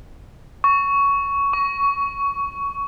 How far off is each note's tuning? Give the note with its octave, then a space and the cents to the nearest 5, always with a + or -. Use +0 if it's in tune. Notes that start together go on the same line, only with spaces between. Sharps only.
C#6 +10
C#6 +20